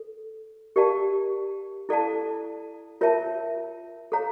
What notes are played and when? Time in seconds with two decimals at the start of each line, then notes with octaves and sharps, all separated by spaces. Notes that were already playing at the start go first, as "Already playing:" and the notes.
Already playing: A4
0.76 G4 A#4 D5 F5 A5
1.89 E4 A4 D5 F5 A5
3.01 F4 A#4 C#5 E5 A5
4.12 A4 C#5 F5 A#5